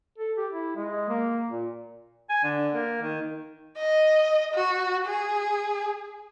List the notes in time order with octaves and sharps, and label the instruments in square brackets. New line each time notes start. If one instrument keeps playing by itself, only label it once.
[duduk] A4
G4
E4
G#3
A#3
A#2
[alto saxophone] G#5
D3
A#3
D#3
[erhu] D#5
F#4
G#4